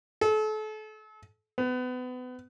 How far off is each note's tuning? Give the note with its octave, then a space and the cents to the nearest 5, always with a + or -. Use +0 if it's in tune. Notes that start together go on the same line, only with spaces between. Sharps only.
A4 -35
B3 +30